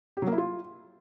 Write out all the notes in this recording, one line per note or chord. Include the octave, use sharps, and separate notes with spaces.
G4
F#3
A#3
E4
F4